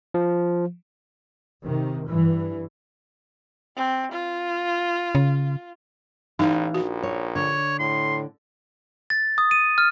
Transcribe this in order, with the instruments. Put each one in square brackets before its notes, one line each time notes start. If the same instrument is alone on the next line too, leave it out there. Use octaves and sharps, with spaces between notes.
[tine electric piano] F3
[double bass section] C3 D#3
G2 E3
[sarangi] C4
F4
[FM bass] C#3
[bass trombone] A1 [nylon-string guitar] E3 E4 F5 [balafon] D#4
[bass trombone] A#1 [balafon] F#4
[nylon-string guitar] C#5
[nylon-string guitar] D3 [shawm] C#5
[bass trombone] A2 [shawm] C6
[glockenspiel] A6
D#6
D#7
F6